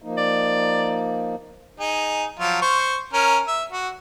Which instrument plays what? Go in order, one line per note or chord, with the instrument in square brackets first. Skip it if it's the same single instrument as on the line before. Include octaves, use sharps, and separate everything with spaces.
[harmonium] F3 A#3 D#4
[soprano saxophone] D5
[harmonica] D#4 G#4
F3 F#3 F4
C5 C#6
C#4 A#4
E5
F#4